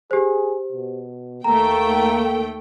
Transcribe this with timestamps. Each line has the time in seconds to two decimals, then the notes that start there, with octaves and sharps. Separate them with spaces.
0.11 G4 G#4 C5
0.72 B2
1.44 D#2 A3 A#3 G5 A#5